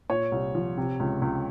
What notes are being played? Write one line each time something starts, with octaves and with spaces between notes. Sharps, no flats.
A#2 C#5
C2
F3
C3
C#2
C#2